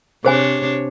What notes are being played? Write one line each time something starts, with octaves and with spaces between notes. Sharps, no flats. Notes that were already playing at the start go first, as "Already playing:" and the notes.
C3 D4 G#4 C5 C#5 G#5